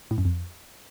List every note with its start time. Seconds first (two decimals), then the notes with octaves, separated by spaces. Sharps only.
0.11 A2
0.18 F#2
0.25 F2